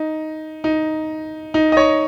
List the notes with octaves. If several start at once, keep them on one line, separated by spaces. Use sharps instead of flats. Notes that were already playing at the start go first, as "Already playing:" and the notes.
Already playing: D#4
D#4
D#4
D#5
C#5